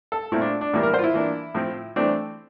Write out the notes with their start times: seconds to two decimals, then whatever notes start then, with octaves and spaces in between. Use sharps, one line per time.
0.12 A4
0.32 A#2 A3 C4 E4
0.41 D4
0.61 D4
0.74 A2 E3 G3 A#3 D4
0.83 A#4
0.94 C5
0.99 F4
1.04 E4
1.14 E3 A#3 D4
1.55 A2 F3 C4
1.96 E3 A3 C4 D4